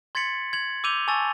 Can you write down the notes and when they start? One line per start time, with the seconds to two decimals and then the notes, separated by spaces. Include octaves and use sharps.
0.15 C6 G#6 A6 B6 C#7 F#7
0.53 G#6 F#7
0.84 D6 E6 G6 D#7 F7 G7
1.08 G#5 A5 C#6 E6 A6